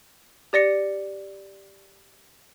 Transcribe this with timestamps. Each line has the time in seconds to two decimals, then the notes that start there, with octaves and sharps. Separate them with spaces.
0.53 G4 D5 A#6 C#7